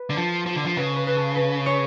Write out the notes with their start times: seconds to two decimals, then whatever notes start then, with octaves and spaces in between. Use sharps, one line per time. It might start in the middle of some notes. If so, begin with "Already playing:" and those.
Already playing: B4
0.10 D3
0.16 F3 A4
0.46 F3
0.56 D3
0.65 F3
0.76 C#3 B4
0.96 B4
1.07 B4
1.16 A4
1.36 B4
1.66 C#5